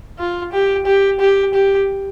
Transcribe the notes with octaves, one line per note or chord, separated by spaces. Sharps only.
F4
G4
G4
G4
G4